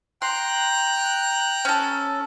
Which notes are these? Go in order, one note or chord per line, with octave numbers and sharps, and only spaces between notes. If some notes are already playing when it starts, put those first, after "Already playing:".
G5 A#5 C6 F#6
C#4 A4